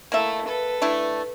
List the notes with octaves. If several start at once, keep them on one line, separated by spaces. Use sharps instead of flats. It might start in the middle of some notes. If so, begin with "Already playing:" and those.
A3 A#3 E4 E5
A4 B4
A3 D4 E4